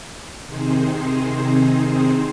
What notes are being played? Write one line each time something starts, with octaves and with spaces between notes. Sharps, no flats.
C3 D#3 C4 D#4 G#4 C5